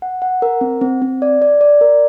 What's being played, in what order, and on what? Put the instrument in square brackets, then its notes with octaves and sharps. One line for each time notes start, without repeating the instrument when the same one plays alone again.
[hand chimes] F#5
F#5
A#4
C4
C4
C4
D5
D5
D5
A#4